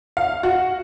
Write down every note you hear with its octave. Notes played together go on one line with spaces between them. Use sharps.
F5
F#4